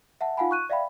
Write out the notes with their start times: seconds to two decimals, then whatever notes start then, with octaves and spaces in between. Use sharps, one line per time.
0.21 E5 F#5 A5
0.37 D#4 F4 F5 F#5 G#5 B5
0.51 C#6 F#6 D#7
0.70 D5 E5 F5 G5 B5